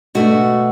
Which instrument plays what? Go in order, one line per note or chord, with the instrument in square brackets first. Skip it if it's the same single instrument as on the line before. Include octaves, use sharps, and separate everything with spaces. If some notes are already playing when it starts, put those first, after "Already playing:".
[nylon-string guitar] B2 A3 D4 F#4